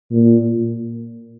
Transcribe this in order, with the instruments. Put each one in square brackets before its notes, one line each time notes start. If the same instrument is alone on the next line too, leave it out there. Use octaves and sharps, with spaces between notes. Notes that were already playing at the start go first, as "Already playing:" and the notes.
[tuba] A#2